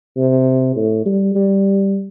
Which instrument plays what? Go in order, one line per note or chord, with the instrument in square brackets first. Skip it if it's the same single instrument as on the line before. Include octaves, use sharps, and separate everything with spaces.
[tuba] C3
A2
G3
G3